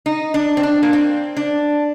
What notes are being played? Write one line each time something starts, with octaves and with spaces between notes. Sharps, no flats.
D#4
D4
C4
D4
A#3
C4
D4